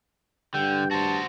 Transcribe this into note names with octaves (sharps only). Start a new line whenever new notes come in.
G2 D3 G5
F#4 C5 A5